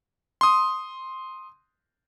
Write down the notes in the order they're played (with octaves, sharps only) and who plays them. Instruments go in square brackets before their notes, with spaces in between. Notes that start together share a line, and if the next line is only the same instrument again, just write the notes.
[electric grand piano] C6 D#6